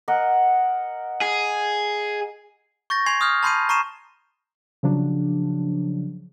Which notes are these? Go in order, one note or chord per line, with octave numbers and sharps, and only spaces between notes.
A#4 D#5 F#5
G#4
C#6 G6 A6 A#6
G#5 C6 G#6 C7 F7
C6 D#6 F6 G6
A5 B5 C6 G6 C7 D#7
A#5 C#6 C7 D#7 E7
C#3 F3 F#3 D4